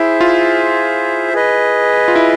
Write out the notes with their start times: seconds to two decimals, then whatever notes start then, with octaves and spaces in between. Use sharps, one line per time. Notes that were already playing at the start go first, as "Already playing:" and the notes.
Already playing: E4 G#4 C5 E5
0.21 F4
1.33 G#4 B4 D#5
2.08 F4
2.16 E4